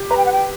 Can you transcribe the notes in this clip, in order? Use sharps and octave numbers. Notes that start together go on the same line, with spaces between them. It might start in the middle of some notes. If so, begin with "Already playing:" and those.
Already playing: G4
B4 A#5
G5
F#5
G5